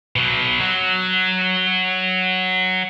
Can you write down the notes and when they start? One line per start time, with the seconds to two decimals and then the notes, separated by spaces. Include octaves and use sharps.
0.16 B2 F#3
0.60 F#3